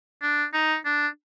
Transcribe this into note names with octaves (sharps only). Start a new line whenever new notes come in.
D4
D#4
D4